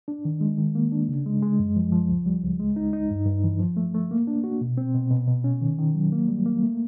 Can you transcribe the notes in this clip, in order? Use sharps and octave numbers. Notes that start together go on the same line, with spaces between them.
D4
D#3
G#3
D#3
A#3
D4
C#3
G#3
G#3
F#2
F3
F3
C#2
G3
C#2
G#3
D#4
D#4
G2
G2
E3
F3
A3
A3
A#3
D4
F#4
B2
C4
B2
B2
B2
C#4
D#3
D#3
F#3
A#3
G3
A#3
A3